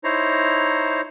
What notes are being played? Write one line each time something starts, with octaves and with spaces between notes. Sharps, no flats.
D#4 E4 C5 C#5 A#5